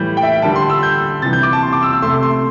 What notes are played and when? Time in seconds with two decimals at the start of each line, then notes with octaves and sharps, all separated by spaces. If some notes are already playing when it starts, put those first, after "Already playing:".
Already playing: A2 E3 G3 G6
0.17 G5
0.23 E5
0.42 D3 G3 A5
0.56 C6
0.70 E6
0.83 G6
1.22 C3 E3 G3 A6
1.33 G6
1.43 D6
1.53 A5
1.62 C6
1.73 D6
1.83 E6
1.93 E6
2.02 C3 A3 C6
2.23 C6